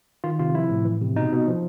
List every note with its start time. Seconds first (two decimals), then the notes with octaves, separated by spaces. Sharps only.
0.24 D#3 F4
0.39 C3 F4
0.55 F3 E4
0.70 A2
0.85 E3
1.01 C3
1.16 B2 D#4
1.32 B2
1.47 F3